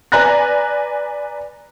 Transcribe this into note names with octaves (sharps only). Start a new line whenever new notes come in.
B4 D5 G#5 A#5 F#6 A#6